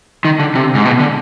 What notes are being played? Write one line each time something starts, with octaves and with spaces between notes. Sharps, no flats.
D#3
D3
C3
G#2
B2
D3